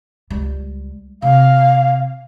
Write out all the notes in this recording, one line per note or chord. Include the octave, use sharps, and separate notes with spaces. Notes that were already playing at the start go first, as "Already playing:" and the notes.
C#2 G3
C3 F5